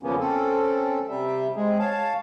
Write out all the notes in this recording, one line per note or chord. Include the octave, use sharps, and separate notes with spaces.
E2 C#3 F3 A#3 B3 C#4
C4 C#4 A4
C3 G3 E5
G#3 C4 G#4
C#5 F5 A5